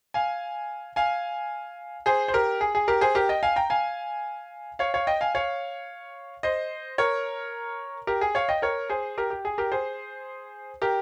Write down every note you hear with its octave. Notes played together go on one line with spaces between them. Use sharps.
F5 G#5
F5 G#5
G#4 C5
C5
G4 A#4
G#4
G#4
G4 A#4
G#4 C5
G4 A#4
D#5 G5
F5 G#5
G5 A#5
F5 G#5
C#5 F5
C#5 F5
D#5 G5
F5 G#5
C#5 F5
C5 D#5
A#4 C#5
G4 A#4
G#4
C#5 F5
D#5 G5
A#4 C#5
G#4 C5
G4 A#4
G4
G#4
G4 A#4
G#4 C5
G4 A#4